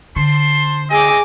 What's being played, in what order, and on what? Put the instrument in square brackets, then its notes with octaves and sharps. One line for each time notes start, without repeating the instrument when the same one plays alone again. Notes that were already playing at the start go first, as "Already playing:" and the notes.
[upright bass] D3 [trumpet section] C5 A5 C6
[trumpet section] C4 D#5 [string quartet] G#4 D6